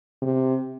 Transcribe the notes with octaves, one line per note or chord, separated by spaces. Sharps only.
C3